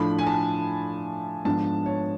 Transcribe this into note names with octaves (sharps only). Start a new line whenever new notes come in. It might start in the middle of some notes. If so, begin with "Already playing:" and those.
Already playing: A2 F3 A3 D4 B5
G#5
A5
G#2 F3 B3 D4 A5
C#5